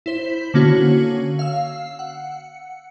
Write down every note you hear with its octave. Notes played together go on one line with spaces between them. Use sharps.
E4 C5 B6
D3 A#3 C#4 F#4 C#5
F5 E6
F#5